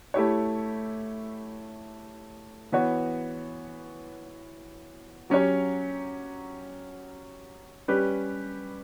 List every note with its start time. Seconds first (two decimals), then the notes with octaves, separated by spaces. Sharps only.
0.14 A3 E4 G4 C#5
2.72 E3 B3 F#4 C#5
5.30 F#3 C#4 G4 C#5
7.88 G3 C#4 G4 B4